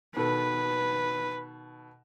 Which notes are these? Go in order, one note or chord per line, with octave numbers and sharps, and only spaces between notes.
B2 D#3 A4 B4